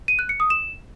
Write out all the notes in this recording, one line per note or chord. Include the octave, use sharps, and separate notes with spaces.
D#7
F#6
C#7
D#6
E7